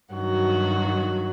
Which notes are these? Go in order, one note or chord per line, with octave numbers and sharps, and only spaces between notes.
G2 D#3 F#3 F#4